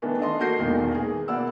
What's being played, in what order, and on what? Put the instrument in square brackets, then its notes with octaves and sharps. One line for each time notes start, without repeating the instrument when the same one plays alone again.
[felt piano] D#3 E3 A3 B3 D4
D4 A4 D#5 C6
A#3 F#4 A4 G6 A#6 C7
E1 B1 A#2 D#3
E3 G#4
B2 A#3 E4 D5 F#5 E6